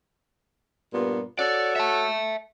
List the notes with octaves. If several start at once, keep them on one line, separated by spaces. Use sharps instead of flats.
G2 A#2 B3
F#4 A4 C#5 D5
E5 A5